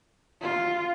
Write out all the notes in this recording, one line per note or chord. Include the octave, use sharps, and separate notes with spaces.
F4